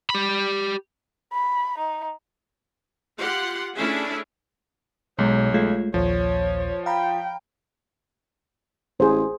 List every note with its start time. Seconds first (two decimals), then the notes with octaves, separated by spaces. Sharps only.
0.10 G4 B5
1.33 B5
1.78 D#4
3.20 F4 G4 F#5 C6
3.75 A3 C#4 D4 E4 G#4 E5
5.19 B1 B2 G#3 C#5
5.54 G#3 A3 F4
5.94 A#1 D#2 A#2 F3 C#5
6.86 F5 G5 A#5 B5
9.00 A1 G#4 C5